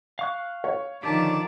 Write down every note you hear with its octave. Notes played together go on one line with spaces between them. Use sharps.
F5 C#6 F#6
C#5
D3 D#3 F3 G4 A5 D6